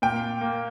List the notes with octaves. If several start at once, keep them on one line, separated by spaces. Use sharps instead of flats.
A#2 G5
A#3